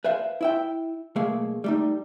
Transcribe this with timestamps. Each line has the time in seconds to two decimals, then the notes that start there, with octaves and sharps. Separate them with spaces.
0.05 B4 C5 E5 F5
0.41 E4 E5 G5
1.16 B1 A3 A#3 G#4 F5
1.64 G3 A3 D#4